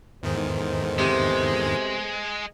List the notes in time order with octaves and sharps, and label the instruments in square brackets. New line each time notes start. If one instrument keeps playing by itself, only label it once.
[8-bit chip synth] E2 G#2 D#3 [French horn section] B3 A4 C5
[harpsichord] C3 [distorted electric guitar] G#3